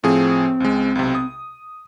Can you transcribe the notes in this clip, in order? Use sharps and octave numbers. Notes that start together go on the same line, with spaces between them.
A2 F3 C4 G#4
C#2 G#3
B1 C3
D#6